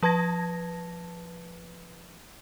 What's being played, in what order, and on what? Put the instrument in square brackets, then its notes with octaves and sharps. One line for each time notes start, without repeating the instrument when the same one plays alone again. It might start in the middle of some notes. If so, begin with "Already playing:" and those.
[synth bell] F3 B4 A5 G#6 A#6